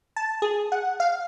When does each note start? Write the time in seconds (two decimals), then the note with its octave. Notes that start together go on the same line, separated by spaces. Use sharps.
0.16 A5
0.42 G#4
0.72 F#5
1.00 F5